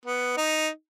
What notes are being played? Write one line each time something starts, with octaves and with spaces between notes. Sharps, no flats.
B3
D#4